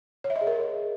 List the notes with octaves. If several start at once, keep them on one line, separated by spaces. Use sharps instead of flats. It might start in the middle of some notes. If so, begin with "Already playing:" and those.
C#5
E5
D#5
G#4
A#4